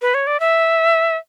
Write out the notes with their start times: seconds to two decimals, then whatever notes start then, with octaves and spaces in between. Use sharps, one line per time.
0.02 B4
0.14 C#5
0.27 D5
0.40 E5